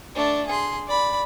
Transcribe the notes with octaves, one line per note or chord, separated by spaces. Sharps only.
A3 D4
G#4 C6
D5 B5